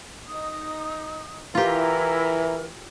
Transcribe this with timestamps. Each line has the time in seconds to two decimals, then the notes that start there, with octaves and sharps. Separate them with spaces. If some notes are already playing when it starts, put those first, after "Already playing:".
0.28 D#4 D#6
1.55 E3 E4 F4 G4 A#4 E5 A#5